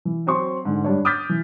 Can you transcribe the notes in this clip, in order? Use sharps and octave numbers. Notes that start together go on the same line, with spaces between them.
E3
F#3 C4 C6 C#6
G#2 D3
G2 D4 C#5
D6 D#6 F6 G6 A6 B6
E3